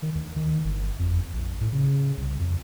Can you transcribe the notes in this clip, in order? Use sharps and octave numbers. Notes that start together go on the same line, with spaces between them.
D#3
D2
D#3
G1
F2
A#1
A2
C#3
C2
F2